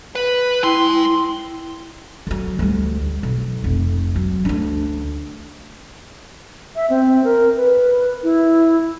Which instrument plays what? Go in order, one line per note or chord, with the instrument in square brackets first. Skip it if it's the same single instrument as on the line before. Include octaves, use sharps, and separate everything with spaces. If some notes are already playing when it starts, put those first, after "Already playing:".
[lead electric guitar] B4
[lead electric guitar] G#3 C6 [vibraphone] E4 G5
[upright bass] D3 F#3
D2 G3
B1
F1
F#3
D2 D4
[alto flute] E5
C4
A#4
B4
E4